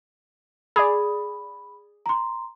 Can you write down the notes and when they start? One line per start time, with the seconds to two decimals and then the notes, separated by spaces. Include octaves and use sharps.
0.76 G#4 D5 B5
2.06 A#5 C6